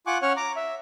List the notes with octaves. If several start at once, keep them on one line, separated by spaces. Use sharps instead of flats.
F4 F#5 G#5 C#6 D6 F#6
C#4 C#5 F#5 C#6 F6
A#5 D6
E5